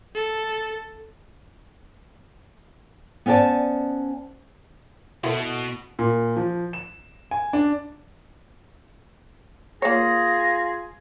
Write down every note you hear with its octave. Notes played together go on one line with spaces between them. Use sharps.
A4
B3 C#4 C5 D5 A5
B2 E4 A4
A#2
F3
E7
G#5
D4
A#3 F4 G#4 C#5 A#6